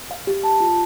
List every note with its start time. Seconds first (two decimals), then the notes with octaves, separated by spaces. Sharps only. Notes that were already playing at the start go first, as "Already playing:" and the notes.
0.11 F5
0.27 G4
0.44 A5
0.60 F4